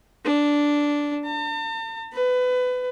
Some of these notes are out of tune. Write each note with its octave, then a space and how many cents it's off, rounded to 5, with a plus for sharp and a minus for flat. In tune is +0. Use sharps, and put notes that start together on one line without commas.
D4 -5
A5 +45
B4 +25